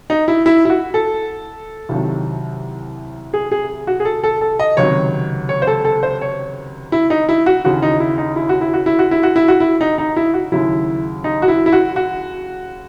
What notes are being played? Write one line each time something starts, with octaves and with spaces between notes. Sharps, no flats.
D#4
E4
E4
E4
F#4
A4
C2 C3 D#3 F#3
G#4
G#4
F#4
G#4
A4
A4
A4
D#5
C#2 C3 D#3 F#3 C#5
C#5
C5
A4
A4
C5
C#5
E4
D#4
E4
F#4
D#2 C#3 E3 F#4
D#4
E4
D#4
E4
F#4
E4
F#4
E4
F#4
E4
F#4
E4
F#4
E4
D#4
D#4
E4
F#4
D#2 C#3 F#3 E4
D#4
F#4
E4
E4
F#4
F#4